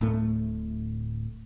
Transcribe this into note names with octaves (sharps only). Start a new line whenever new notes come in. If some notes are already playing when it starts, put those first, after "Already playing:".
D1 A2 A3